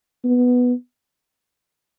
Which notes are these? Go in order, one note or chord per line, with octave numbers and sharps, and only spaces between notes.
B3